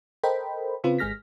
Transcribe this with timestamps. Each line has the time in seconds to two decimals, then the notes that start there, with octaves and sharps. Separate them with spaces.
0.24 A4 A#4 C5 D#5 G5 B5
0.84 C#3 C4 F4 B4
0.98 G#1 G#3 G#4 F6 A#6 B6